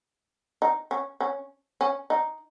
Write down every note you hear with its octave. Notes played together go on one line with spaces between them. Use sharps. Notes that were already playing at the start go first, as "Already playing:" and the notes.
D#4
C#4
C#4
C#4
D#4